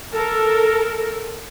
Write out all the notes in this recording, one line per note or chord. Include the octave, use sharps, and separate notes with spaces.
A4 A#4